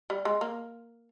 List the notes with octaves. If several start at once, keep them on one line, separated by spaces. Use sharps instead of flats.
G3
G#3
A#3